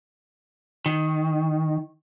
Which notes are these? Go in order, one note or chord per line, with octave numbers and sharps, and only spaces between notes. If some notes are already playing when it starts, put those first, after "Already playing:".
D#3